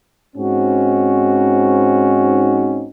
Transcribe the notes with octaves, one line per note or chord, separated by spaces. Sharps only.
G#2 C4 C#4 D#4 F#4